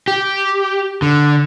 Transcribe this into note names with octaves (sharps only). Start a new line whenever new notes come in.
G4
D3